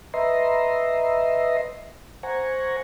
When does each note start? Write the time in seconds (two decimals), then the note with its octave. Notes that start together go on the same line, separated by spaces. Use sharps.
0.14 B4 D#5 E5 A#5 C6
2.23 C5 F#5 G#5 A#5 C#6